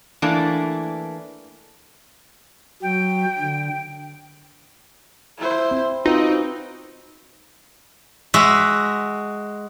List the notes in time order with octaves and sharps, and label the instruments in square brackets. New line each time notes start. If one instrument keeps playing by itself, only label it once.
[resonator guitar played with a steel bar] E3 A3 A#3 D4
[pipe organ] F#3 [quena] G5
[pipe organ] D3
[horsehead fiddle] E4 C5
[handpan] C4
[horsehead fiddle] C4 [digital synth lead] D#4 [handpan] F4 F#4 B4
[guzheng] G#3 F#4 E5